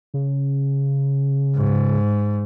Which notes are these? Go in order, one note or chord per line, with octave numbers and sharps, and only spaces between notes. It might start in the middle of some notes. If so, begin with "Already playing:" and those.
C#3
G#2